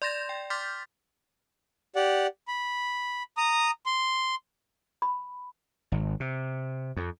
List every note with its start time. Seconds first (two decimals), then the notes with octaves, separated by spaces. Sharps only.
0.02 D5 C6 G6 A6 A#6 E7
0.29 G5
0.50 C6 D6 F6 G6 A6 B6
1.96 G4 D5 F#5
2.48 B5
3.37 A#5 D#6
3.86 C6
5.02 B5
5.92 G#1
6.20 C3
6.97 F2